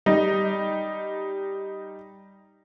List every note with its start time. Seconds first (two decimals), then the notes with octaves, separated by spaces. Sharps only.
0.06 G3 D#4